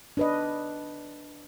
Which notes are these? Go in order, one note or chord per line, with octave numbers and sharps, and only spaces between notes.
D4 B4 D#5